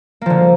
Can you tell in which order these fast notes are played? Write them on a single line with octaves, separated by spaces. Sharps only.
A#3 F3 D3